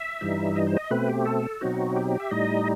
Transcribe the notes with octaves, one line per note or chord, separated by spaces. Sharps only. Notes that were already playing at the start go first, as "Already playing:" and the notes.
Already playing: E5
G2 E3 G3 D#4
D#5
C5
D#5
B2 A3 C4 B4
G4
A4
B2 F#3 C4 D#4 F#4
G4
E5
A2 G3 D#4 D#5